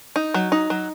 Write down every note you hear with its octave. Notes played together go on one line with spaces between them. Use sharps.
D#4
F#3
D#4
F#3